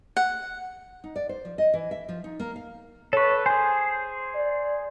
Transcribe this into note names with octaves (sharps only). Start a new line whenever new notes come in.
F#5
D#4
D5
C5
F3
D#5
E3
E5
F3
D#4
A#3
F5
A4 B4 C#5 C#6
G#4 C5 G#5
D5